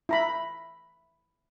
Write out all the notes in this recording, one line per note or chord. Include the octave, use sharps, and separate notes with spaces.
E4 A#5 B5